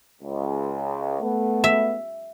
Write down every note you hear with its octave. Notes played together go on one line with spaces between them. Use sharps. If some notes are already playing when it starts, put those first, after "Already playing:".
C#2
A3 B3
E5